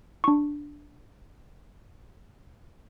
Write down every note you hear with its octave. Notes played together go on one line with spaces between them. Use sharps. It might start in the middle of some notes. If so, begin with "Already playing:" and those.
D4 C#6